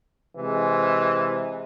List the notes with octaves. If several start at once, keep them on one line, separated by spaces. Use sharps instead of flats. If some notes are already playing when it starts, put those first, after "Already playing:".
C3 E3 G#3